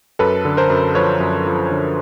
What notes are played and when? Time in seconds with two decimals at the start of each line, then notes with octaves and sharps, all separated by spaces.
0.19 F#2 A4 B4
0.45 D3
0.57 A#4 C5
0.70 F#2
0.95 F3 B4 C#5
1.20 F#2
1.46 F3
1.71 D3